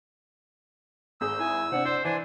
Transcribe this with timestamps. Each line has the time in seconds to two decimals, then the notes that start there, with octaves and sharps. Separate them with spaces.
1.21 G#1 G#4 E6 G6
1.40 E4 G#5
1.72 C3 C4 D4 C5 F#5
1.85 C5 D5
2.05 E3 D4 C5 G#5